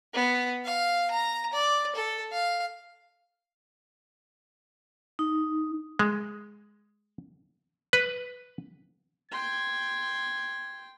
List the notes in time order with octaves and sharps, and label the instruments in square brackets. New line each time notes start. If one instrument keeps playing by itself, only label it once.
[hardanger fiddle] B3
F5
A#5
D5
A4
F5
[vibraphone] D#4
[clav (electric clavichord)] G#3
B4
[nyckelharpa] G5 C6 [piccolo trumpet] G#6